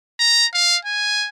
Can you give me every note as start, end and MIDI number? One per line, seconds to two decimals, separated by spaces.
0.20 0.46 82
0.54 0.77 77
0.85 1.29 80